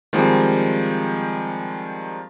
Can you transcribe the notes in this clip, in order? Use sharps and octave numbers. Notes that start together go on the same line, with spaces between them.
D#3 F3 G3 G#3 A#3 C4